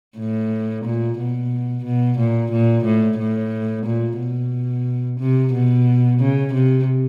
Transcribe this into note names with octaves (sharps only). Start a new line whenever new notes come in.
A2
A#2
B2
B2
A#2
A#2
A2
A2
A#2
B2
C3
B2
C#3
C3